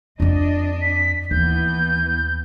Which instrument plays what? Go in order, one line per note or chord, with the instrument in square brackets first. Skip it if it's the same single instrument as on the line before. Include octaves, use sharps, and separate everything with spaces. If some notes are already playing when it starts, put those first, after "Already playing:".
[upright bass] F2 C4 [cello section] D4 D#5
[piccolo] B6
[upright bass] D#2 [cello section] E3 B3 [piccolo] G6